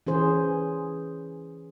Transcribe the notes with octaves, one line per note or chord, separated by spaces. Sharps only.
E3 C#4 G#4 C5